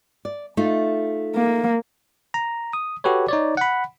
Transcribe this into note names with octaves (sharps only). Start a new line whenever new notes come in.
D5
A3 D#4 F4
A#3
A#5
D#6
F#4 G4 A4 B4 C#5
D#4 C#5 D5
F#5 B5